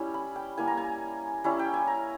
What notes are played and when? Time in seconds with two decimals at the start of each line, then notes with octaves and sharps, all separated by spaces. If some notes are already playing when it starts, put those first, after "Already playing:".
Already playing: G3 C#4 E4
0.14 B5
0.36 G5
0.58 G3 A#3 E4 G#5
0.68 A#5
0.77 G#5
1.44 G3 C#4 E4
1.59 G5
1.74 G#5
1.87 A#5